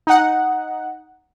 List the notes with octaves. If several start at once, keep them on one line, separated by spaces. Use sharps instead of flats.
D#4 F#5